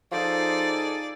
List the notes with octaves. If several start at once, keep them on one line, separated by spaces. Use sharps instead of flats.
F3 D#4 G#4 A4 D5